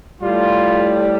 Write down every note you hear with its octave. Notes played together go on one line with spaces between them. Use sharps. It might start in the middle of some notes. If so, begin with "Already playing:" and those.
A2 G3 F4